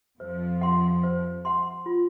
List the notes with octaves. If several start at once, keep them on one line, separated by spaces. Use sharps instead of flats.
F2 F3 C5
F#5 C6
C5
F#5 C6
F4